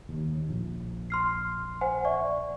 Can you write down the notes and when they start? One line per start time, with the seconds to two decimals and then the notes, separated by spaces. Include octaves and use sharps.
0.09 D#2
0.49 A#1
1.10 C6 F6 C7
1.81 C5 F#5 G#5
2.05 D5 E5 C#6